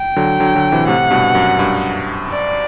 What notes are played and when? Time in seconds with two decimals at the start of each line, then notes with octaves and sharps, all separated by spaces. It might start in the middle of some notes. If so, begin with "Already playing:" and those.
Already playing: G5
0.16 D3 F#3
0.40 D3 F#3
0.55 D3 F#3
0.72 C3 E3
0.87 A2 C3 F#5
1.11 G2 B2
1.35 F#2
1.59 G2
2.30 D5